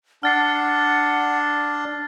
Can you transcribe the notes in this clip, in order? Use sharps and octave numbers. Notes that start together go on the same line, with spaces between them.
D4 F#5 F6 A6 C7